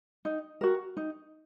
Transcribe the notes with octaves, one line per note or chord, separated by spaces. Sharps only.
D#4
F#4 A#4
D#4